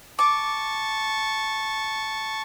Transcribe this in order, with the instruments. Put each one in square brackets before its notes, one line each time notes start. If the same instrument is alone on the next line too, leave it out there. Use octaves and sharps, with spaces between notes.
[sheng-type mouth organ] A5 C#6 [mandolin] D6